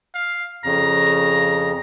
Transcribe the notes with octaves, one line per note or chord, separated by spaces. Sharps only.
F5
F2 C#3 A#5